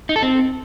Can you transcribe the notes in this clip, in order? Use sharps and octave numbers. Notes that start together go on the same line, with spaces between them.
D#4
A4
C4